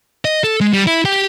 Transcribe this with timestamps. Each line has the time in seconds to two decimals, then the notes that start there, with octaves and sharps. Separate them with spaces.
0.25 D#5
0.44 A4
0.61 G#3
0.73 G3
0.87 E4
1.05 G4 G5